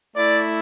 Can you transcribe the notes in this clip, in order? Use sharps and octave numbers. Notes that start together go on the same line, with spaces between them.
A3 E4 D5